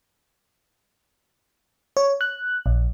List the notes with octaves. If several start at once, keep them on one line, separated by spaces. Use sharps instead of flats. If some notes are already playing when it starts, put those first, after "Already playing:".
C#5
F#6
A#1